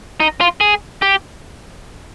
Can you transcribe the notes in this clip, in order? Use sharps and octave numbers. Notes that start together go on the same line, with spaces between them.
D#4
F4
G#4
G4